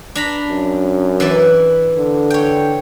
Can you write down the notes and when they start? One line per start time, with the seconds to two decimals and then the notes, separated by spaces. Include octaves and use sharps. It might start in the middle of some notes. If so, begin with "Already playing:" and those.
0.15 D4 A#5 B5
0.47 F#2
1.20 E3 E4 D5
1.96 D3
2.30 C#5 G5